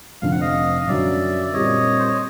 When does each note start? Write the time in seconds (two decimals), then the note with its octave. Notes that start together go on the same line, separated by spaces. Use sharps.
0.22 F1 F2 D3 F5
0.31 F#5
0.41 D#5 F5
0.81 D#5
0.87 F#2 D3 F#3 D5 E5
1.46 D5
1.53 A#2 G3 C4 C#5 D#5
1.99 C5
2.09 C#5